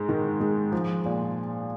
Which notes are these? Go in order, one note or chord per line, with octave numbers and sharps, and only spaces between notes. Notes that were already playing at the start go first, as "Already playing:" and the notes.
Already playing: G#2 G#3
D#3
G#3
F3
A#2